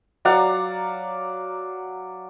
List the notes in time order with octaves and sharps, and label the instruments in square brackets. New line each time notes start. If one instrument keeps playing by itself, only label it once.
[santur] F#3 D5 F5 F#5